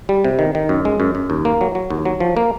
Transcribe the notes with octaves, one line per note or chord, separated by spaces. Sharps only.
G3
C3
D#3
D#3
F#2
G#3
F#2
F#2
D#2
A#3
F#3
F#3
D#2
F#3
F3
A#3